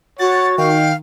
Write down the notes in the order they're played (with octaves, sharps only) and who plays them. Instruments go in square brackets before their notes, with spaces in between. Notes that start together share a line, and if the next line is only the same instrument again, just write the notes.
[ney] F#4 [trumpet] C#5 [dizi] F#5 [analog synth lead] A6
[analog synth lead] D#3 [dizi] F5 [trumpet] G5